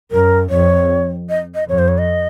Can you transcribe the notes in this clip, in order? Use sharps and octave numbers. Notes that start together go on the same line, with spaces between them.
F#2 A#4
F2 C#5
D#5
D#5
F2 C#5
C5
C#5
D#5